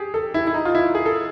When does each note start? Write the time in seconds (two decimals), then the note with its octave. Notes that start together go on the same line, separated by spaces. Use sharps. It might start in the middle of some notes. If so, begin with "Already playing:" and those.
Already playing: G4 G#4
0.14 A4
0.34 E4
0.47 E4
0.54 D#4
0.65 F4
0.75 E4
0.95 G#4
1.06 A4